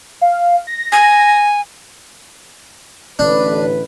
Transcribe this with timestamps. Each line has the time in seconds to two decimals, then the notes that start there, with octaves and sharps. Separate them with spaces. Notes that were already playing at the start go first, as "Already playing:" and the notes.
0.21 F5
0.67 A#6
0.92 G#5
3.19 A1 D3 D4 B4